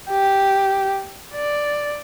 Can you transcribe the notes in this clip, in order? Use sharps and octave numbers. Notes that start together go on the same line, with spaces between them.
G4
D5